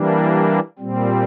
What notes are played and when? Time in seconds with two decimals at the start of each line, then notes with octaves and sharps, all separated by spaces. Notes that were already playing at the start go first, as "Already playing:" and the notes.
Already playing: E3 G3 A#3 D4
0.79 A#2 G3 C4